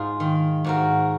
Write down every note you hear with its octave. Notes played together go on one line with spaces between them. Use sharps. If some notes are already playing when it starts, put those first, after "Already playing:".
Already playing: G#2 G#3 F4 G#4
D#3
G#2 F#4 A#4